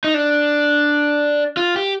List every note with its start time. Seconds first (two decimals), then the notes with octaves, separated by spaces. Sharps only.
0.04 D#4
0.14 D4
1.57 F4
1.76 G4